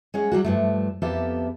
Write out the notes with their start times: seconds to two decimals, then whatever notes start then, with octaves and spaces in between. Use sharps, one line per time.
0.14 G#3 C#4 C#5 F#5
0.32 F#3 G3 A#3 F#4
0.44 G2 F3 A3
1.02 F2 A#3 B3 G4 A4 E5